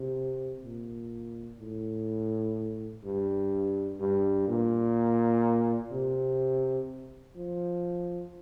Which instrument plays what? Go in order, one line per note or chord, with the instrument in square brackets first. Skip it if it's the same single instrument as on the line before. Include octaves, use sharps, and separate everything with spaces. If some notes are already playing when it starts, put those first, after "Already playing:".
Already playing: [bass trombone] C3
A#2
A2
G2
G2
A#2
C3
F3